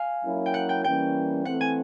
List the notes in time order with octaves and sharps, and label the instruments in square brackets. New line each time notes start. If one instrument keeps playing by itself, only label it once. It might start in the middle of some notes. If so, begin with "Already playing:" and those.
Already playing: [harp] F5 G#5
[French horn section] F#3 A#3 C#4 E4
[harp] G5
F#5
G5
[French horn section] E3 G3 A#3 C#4 [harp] G5
[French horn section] E3 A3 C4 [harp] F#5
[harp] G#5